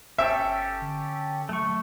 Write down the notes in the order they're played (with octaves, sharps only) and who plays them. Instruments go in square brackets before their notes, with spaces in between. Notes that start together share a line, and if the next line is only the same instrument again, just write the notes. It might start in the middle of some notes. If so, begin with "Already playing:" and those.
[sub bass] G1 [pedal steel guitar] C#4 G4 A4 [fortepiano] E5
[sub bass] D3
[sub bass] F#3 [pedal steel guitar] A3 C#6